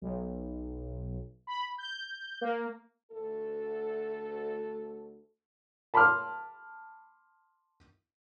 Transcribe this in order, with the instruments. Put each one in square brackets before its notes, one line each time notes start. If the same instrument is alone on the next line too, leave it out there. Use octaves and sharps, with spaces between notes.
[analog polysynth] B1
B5
G6
A#3
[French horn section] D2 A3 A4
[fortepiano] A5 B5 C6 D6 F6